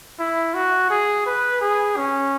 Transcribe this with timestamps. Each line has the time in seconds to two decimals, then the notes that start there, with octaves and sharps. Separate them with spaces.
0.19 E4
0.54 F#4
0.90 G#4
1.26 B4
1.61 G#4
1.97 C#4